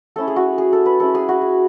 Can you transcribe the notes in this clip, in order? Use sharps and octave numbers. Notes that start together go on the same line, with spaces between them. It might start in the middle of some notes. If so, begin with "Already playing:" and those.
A3 C#4 E4 A4
G#4
F#4
G#4
A4
B4
G#3 C#4 E4 A4
G#4
F#4
G#4